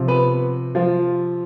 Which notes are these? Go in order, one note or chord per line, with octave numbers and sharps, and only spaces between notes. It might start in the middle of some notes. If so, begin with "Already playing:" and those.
Already playing: C3 F3
B3 B4
F3 F4